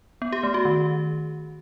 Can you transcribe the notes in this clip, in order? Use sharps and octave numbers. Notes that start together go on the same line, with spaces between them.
B3
G4
A3
F#4
D#3